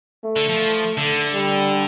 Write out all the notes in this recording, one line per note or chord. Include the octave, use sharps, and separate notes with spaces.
A3
D3
F3
D3
G3